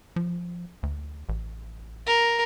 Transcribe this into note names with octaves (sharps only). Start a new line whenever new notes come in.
F3
D2
A1
A#4